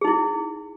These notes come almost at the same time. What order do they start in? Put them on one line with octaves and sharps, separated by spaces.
G#4 D#4 E4